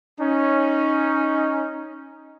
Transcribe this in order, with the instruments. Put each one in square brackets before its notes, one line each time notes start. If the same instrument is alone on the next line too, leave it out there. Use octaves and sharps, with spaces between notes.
[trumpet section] C#4 D#4